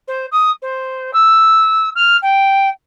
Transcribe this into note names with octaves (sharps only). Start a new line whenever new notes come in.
C5
D#6
C5
E6
F6
G5